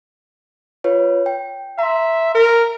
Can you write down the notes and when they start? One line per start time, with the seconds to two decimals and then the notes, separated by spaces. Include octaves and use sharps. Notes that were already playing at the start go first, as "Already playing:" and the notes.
0.84 F4 B4 C#5
1.26 G5
1.79 E5 A#5 C6
2.35 A#4